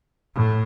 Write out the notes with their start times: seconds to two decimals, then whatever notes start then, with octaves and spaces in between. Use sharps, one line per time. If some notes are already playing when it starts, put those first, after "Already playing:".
0.35 A2